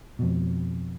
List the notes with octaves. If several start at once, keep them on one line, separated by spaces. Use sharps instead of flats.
F2 B2